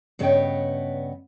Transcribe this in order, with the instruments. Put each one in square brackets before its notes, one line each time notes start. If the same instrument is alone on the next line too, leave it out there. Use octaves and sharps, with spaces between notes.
[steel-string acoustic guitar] G2 C#3 B3 C#5 D#5 G5